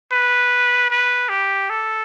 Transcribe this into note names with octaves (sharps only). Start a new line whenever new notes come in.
B4
B4
G4
A4